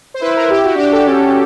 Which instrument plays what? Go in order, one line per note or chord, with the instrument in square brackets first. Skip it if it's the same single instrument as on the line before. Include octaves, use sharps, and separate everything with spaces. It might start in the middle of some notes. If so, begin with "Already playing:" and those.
[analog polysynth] C5
[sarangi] E4 [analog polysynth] B4
[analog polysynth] A#4
G4
F#4
[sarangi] D4 [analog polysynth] G4
[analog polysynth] A4
[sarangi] C#4